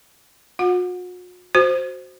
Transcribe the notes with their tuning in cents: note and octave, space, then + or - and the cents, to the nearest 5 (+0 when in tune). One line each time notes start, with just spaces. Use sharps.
F#4 -45 F#5 -25
F#4 +0 C5 +0